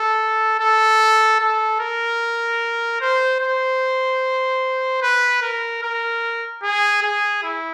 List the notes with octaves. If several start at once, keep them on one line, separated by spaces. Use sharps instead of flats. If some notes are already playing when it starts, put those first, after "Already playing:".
Already playing: A4
A4
A4
A#4
C5
C5
B4
A#4
A#4
G#4
G#4
E4